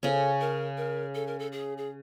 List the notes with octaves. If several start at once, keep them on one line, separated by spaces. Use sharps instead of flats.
C#3 C#4 A4
A#4
A#4
A4
A#4
A4
G#4
G#4